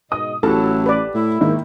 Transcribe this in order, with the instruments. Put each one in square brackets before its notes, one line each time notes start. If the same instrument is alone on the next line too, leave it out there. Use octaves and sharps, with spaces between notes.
[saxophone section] G#2 B2 D#5 [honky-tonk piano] D#6
[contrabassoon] A1 [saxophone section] F#3 E4 [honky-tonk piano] G4 A5 [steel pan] A4
[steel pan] B4 D5
[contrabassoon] A2 [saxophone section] E4
[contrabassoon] G#2 [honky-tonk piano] D#3 A#3